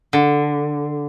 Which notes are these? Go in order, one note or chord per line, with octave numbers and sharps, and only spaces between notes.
D3